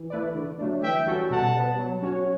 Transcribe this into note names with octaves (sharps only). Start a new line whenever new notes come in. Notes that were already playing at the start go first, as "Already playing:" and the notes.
Already playing: E3
A3 E4 B4 D5
D3
F#3 A3 D4
E3 E5 G5
G3 C#4 F#4 A4
B2 F#5 A5
G3 B3
F#3
C#4 F#4 C#5